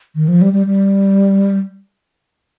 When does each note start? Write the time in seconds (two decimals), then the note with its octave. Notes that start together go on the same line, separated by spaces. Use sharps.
0.15 D#3
0.28 F3
0.42 G3
0.53 G3
0.67 G3